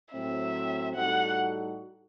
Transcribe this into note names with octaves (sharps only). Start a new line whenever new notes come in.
A2 F#3 C4 E5
A2 G3 D#4 F#4 A4 F#5